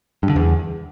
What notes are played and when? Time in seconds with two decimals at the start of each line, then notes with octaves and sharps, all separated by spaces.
0.23 G2
0.29 D3
0.36 E2